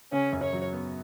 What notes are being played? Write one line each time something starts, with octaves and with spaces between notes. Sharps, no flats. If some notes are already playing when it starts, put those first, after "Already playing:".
C#3 C#4
F#2
C#5
F#3
B3